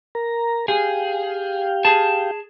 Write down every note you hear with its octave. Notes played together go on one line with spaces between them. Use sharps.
A#4 A#5
G4 G#4 F5 G5
G#4 A5